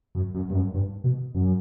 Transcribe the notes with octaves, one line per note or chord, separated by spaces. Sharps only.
F#2
F#2
G2
F#2
G2
B2
F#2